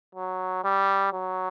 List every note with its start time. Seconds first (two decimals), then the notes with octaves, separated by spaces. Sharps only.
0.15 F#3
0.64 G3
1.13 F#3